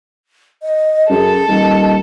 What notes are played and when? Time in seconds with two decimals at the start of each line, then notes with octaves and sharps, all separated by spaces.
0.62 D#5
1.10 F#2 G#4 A4
1.48 D#1 D#5